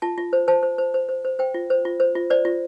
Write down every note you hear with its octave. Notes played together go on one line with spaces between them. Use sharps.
F4 A5
F4
C5
C5 A5
C5
C5
C5
C5
C5
C5 G5
F4
C5
F4
C5
F4
C5 D5
F4